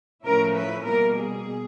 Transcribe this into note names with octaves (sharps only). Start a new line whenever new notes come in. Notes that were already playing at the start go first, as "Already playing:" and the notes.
A2 F3 A3 C#4 E4 A#4
B4
B2 G3 A#3 A#4
G#4